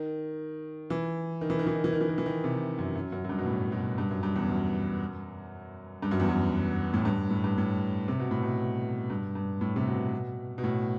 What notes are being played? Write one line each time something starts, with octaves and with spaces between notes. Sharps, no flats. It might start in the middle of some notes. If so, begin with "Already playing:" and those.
Already playing: D#3
E3
D#3
E3
D#3
E3
D#3
E3
D#3
E3
D#3
E3
D#3
C3
F#2
F#2
F#2
F#2
G2
B2
A2
B2
G2
F#2
G2
E2
F#2
G2
F#2
E2
F#2
A2
G2
A2
G2
A2
C3
B2
A2
B2
G2
G2
A2
C3
B2
B2
A2